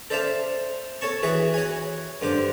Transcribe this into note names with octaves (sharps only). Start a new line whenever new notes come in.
A4 C5 D5 E5 F5 A5
A4 C#5 A5 C#6
E3 F#4 G#4 E5
F#4 C#5 G#5
G2 D3 C5 D6